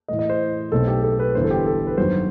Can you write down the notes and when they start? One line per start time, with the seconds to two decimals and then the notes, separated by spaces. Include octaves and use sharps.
0.08 A2 E3 A3 D#5
0.19 D#5
0.30 C5
0.72 B1 B2 A3 C4 D#4 A4
0.88 G4
1.03 A4
1.19 B4
1.35 G1 G2 E3 C5
1.44 A4
1.51 G4
1.66 A4
1.87 B4
1.98 G2 D#3 F#3 C5